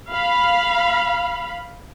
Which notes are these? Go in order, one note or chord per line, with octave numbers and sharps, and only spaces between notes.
F5 B5